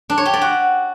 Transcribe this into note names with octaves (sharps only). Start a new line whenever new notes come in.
D4
C#5
G4
D5
F#4